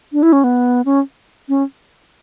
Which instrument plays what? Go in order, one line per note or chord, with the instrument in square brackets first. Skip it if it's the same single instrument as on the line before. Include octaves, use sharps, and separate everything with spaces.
[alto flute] D4
E4
C#4
B3
C#4
C#4